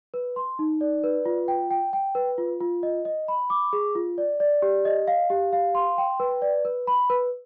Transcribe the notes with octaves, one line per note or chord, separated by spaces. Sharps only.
B4
C6
D#4
D5
B4
F4
G5
G5
G5
B4
F4
F4
D#5
D#5
B5
D6
G#4
F4
D5
D5
G4
D#5
F5
G4
F5
C6
G5
B4
D5
B4
B5
B4